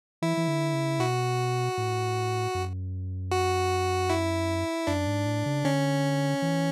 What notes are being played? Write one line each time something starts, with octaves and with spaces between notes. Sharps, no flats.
E3 E4
E3
D3
C#3
B2 F#4
A2
F#2
F#4
E4
F#2 D4
G#2
A2
C#3
D3 C#4
E3